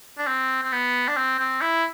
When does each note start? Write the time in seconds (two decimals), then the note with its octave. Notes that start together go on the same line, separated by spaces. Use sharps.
0.18 D4
0.27 C4
0.63 C4
0.72 B3
1.08 D4
1.17 C4
1.39 C4
1.61 E4